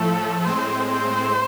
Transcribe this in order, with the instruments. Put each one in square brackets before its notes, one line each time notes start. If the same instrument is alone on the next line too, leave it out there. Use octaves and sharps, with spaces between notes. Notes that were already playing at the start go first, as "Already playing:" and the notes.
Already playing: [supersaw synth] A2 F3 A3 [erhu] A4
[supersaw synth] A2 G#3 C4 [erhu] C5
[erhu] C5